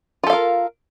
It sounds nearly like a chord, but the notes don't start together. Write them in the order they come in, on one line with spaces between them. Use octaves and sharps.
F4 A4 F5 A#4